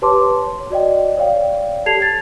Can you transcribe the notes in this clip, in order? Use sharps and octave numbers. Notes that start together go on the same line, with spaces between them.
G4 B4 C#5 A5 C6 D6
C#5
F#4 D5 D#5 G5
C#5 D5 F5 G5
G4 A4 A5 G#6 C7 F7
A6